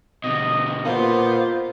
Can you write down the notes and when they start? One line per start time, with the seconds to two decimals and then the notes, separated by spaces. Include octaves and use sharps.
0.24 B2 D3 D#5
0.85 A#2 A#3 B3 F4 C5